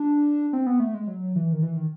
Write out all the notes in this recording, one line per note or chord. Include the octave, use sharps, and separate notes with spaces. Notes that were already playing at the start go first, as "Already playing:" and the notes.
Already playing: D4
C4
B3
A3
G#3
F#3
E3
D#3
E3
D#3